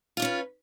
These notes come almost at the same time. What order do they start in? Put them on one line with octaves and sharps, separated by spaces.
F4 D4 C#4 B4